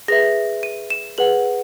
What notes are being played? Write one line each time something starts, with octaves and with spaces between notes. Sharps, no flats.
G#4 B4 E5 A#6
D#7
E7
G#4 B4 F#5 F#7